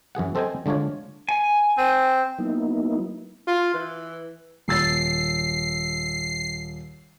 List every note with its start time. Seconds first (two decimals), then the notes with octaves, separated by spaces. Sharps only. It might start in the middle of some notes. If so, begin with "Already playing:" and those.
0.15 F#2 E3 G#4 F#5
0.35 C4 A4 C5 D#5 G5 G#5
0.66 D3 G#3 D4 F4 C#5
1.29 G#5
1.78 C4
2.38 F#3 A#3 B3 D#4 E4
3.47 F4
3.74 E3
4.68 D#1 E6 A6 C7